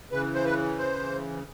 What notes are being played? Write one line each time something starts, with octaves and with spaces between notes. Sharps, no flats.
C#3 E3 B4
C5
B4
C5